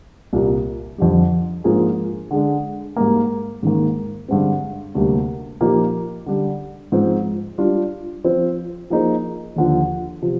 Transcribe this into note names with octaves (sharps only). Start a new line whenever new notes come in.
C2 A#2 G3 A#3
F2 D3 G3
G#2 F3 A#3 D4 G#4
D3 G#3 D4
G#2 G3 A#3
G#2 D#3 A#3
G2 D3 G#3 C4
D2 C3 G3 A#3
A#2 F3 A#3 D#4 G4
D3 G3 D4
G#2 F3 C4
G3 D4 F4
F3 C4 F4 C5
F3 A#3 D#4 G#4 C5
D#2 D3 F3
C3 F3